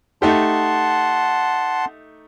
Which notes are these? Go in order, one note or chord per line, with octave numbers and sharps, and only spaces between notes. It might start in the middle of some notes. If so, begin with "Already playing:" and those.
A3 D#4 G4 F#5 A5 C6